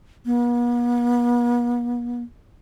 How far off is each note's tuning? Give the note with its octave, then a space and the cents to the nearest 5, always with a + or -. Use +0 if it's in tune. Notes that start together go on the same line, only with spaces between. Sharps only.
B3 -45